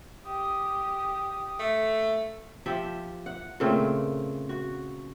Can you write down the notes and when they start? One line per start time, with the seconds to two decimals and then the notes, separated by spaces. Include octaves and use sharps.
0.25 G4 D#6
1.59 A3
2.66 F3 G4 E5
3.26 F#5
3.60 A#2 C#3 A3 C4
4.49 F#4